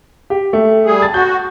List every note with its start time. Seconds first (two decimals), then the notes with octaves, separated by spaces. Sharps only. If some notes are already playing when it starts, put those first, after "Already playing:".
0.30 G4
0.53 A3
0.86 G3 G#4
1.02 A5 A6
1.14 F#4 G6